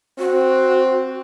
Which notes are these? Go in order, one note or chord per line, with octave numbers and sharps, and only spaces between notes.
C4 F#4